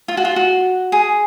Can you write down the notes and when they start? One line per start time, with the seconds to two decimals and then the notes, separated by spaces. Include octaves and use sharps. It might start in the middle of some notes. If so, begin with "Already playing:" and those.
0.08 F4
0.17 F#4
0.25 F4
0.36 F#4
0.92 G#4